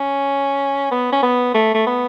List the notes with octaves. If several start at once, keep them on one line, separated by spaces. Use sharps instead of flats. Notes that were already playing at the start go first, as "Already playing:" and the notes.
Already playing: C#4
B3
C#4
B3
A3
A3
B3